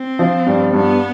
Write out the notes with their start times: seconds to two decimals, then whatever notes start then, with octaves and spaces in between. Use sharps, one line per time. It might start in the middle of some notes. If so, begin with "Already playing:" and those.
Already playing: C4
0.19 F3
0.46 G2
0.73 G2 B3